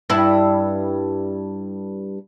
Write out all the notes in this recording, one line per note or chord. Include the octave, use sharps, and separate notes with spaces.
G2 E4